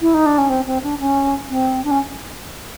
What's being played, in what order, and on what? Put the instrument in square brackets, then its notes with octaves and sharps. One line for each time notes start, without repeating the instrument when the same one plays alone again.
[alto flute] E4
D#4
D4
C#4
C4
C4
D4
C#4
C4
D4
C#4